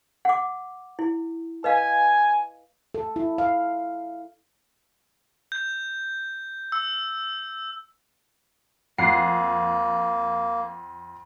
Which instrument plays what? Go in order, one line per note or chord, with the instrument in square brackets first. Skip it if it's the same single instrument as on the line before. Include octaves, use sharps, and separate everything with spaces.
[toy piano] F#5 D6
E4
[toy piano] B4 D#5 F5 [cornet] G#5
[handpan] A4
E4
F5
[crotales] G6
E6
[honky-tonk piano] F2 F#5 C7 [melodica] A#3